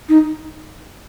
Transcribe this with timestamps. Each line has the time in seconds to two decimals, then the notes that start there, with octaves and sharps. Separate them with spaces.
0.09 D#4